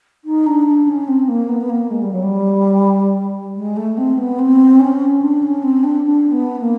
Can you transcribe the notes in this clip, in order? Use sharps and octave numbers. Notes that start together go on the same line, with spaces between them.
D#4
D4
D4
C#4
C4
A#3
B3
B3
A#3
G#3
G3
F#3
G3
G#3
A3
C4
B3
C4
C#4
D4
C#4
C4
D4
D4
B3
A#3